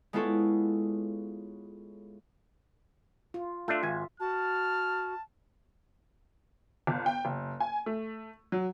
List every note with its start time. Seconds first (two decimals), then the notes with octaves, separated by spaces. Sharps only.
0.13 G#3 B3 E4 F4 A4 C#5
3.34 F4
3.68 A3 D4 F4 E5
3.83 G#1 F4 G#5
4.20 F#4 A5 F6
6.87 G1
7.06 G5
7.25 F#1
7.60 G#5
7.86 A3
8.52 F#3